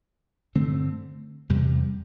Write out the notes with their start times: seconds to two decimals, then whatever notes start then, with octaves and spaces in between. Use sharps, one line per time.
0.55 G2 D3 A3 C4
1.49 E2 C3 G3